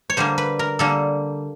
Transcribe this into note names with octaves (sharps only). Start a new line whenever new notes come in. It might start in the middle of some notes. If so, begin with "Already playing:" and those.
C#5
D3 G3 A#3 C5
B4
A#4
D3 G3 A#3 A4